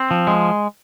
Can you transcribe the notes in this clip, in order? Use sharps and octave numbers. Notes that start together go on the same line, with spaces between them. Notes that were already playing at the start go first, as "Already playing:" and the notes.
Already playing: C4
F3
G#3